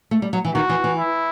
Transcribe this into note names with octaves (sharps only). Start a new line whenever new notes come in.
A3
G3
F#3
E3
D#3 F#4
E3
E3
E4